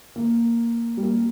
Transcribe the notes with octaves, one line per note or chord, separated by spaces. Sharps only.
A#3
G3
A#3